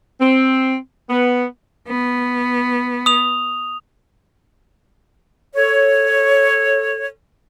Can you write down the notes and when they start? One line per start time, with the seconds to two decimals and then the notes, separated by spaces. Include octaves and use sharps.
0.21 C4
1.10 B3
1.89 B3
3.06 D#6 F7
5.54 A4 C#5